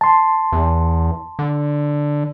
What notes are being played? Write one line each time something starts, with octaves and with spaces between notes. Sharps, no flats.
A5 C6
E2
D3